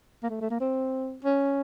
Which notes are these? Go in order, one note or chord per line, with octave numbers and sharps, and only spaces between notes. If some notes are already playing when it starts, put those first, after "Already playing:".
A#3
A3
A3
A#3
C4
C#4